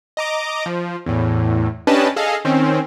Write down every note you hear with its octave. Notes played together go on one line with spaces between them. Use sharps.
D#5 A#5 D6
F3
E2 A2
C#4 D4 G4 B4 D#5 A5
G#4 A4 D#5 F5
D#3 C4 C#4